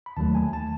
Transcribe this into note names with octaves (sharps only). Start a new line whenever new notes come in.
B5
D#2 D#3 F#3 A3 A5
G#5
A5